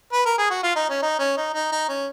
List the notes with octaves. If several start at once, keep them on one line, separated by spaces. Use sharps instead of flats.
B4
A#4
G#4
F#4
F4
D#4
C#4
D#4
C#4
D#4
D#4
D#4
C#4